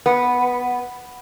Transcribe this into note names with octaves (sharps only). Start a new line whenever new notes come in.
B3